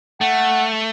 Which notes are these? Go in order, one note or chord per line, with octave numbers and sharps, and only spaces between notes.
A3 F#5